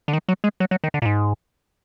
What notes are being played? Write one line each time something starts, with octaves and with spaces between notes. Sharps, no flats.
D3
D#3
F#3
G#3
F#3
F#3
D#3
D3
A#2
G#2